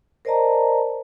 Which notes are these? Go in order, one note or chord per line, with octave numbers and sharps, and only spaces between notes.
A#4 C5 D5 D#5 A5 A#5